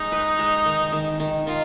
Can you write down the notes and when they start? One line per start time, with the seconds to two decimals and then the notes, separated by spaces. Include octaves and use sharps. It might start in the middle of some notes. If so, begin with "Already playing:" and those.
Already playing: G#3 D#4
0.12 B4
0.39 G#3
0.65 D#3
0.92 D#3
1.20 D#3
1.47 D#3 F4